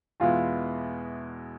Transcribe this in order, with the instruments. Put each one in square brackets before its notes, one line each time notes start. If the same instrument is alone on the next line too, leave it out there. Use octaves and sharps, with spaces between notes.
[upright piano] E2 B2 G#3 B3 E4 [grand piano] F4